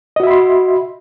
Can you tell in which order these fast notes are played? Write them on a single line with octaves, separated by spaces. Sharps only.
D#5 F#4 E5 B5 C6